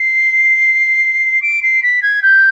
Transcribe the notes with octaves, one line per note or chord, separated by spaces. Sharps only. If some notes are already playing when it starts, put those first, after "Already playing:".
Already playing: C7
D7
C7
B6
G#6
G6